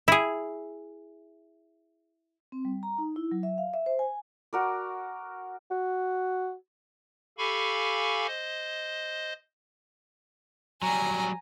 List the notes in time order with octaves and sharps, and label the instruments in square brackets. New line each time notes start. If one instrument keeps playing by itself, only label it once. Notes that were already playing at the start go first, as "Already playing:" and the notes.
[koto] E4 G#4
[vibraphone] C4
G3
A#5
D#4
E4
F#3
E5
F5
E5
C5
G#5
[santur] F#4 A#4 D5
[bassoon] F#4
[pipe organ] G4 A4 F5 G#5 B5 C#6
C5 D#5
[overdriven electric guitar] F#3 G3 [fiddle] G#5 A#5